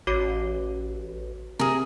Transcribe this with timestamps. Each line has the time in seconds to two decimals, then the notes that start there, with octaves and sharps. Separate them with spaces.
0.07 A1 F#4 C#5 D6
1.59 C3 G#4 A#4